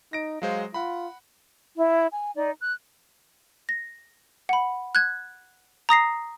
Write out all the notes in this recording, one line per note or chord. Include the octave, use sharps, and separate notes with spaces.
D#4 A#6 D7
F#3 G#3 C5 F5
F4 F#5 B5
E4
G#5
D#4 D5
F#6
A#6
F#5 B5
F#6 G#6
A#5 D#6 A#6 C7